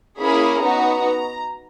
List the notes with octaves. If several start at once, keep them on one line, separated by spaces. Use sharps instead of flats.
A#3 C#4 E4 G#4 B5
B3 D#4 F#4 A#5